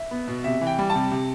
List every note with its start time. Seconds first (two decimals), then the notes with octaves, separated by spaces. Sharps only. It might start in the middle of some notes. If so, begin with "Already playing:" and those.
Already playing: E5
0.11 B3
0.28 B2
0.44 C3 E5
0.61 E3
0.67 G5
0.78 G3
0.90 A5
0.95 C3
1.11 C3